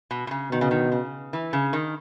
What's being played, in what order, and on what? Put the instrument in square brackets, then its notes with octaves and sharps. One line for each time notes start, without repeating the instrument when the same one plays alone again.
[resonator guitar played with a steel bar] B2
B2
C#3
[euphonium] B2 [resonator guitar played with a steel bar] D#3
[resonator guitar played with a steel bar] C#3
D#3
C#3
E3
C#3
D#3